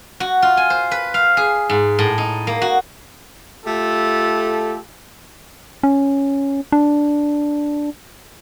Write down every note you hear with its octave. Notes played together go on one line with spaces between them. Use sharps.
F#4
F4
G#5
C5
B4
F5
G#4
G#2
A2
D#4
A#3
F#4
A3 F4 G4 A4
C#4
D4